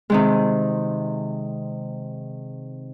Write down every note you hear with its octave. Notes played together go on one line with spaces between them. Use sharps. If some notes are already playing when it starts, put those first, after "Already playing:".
C3 D#3 G#3